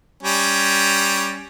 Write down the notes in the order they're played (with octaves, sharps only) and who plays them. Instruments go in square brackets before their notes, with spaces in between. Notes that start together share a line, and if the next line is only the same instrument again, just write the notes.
[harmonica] G3 C#4